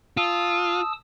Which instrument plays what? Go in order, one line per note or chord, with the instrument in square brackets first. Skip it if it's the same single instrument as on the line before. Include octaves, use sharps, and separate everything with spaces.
[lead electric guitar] F4 [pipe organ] A5 D#6 E6